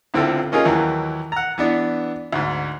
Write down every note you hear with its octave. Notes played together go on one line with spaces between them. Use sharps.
C#2 D3 C4 E4 F4 A4
A#3 C#4 D#4 F4 G#4 A#4
D#2 E3 F#3 A#3
F#5 A#5
E3 B3 D4
D2 G#2